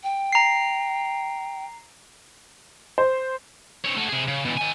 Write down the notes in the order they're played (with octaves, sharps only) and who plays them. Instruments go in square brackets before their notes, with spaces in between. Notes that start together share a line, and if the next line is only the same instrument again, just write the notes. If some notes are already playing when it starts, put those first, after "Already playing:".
[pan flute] G5
[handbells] A#5 C7
[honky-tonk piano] C5
[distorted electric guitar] C4 C#5
A3 F#4
C3 G#4
C#3
B2 E3
D#3 G#5